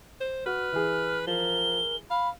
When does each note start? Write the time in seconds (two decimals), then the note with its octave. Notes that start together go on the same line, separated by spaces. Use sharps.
0.20 C5
0.46 F#4 B4 F6
0.73 E3 G#4
1.27 F3 A#4 G7
2.10 F5 B5